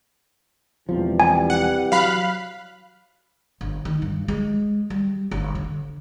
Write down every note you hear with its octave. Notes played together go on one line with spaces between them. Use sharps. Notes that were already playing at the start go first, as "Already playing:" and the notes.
E1 E2 C3 E3 F3 G3
G#5
F#5
F#3 F5 B5 F#6
G1
D#3
G2
G#3
G3
G1
D3